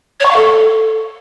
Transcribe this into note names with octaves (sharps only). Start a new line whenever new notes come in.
C#5
C#6
F5
A4